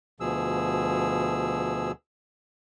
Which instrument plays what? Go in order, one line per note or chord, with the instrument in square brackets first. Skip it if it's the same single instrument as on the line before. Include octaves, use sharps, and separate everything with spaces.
[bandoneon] D2 B2 F3 G#4 E6